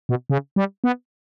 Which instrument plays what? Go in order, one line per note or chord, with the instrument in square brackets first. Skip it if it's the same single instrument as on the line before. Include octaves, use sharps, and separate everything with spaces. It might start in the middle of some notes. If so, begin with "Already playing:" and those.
[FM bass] B2
C#3
G3
B3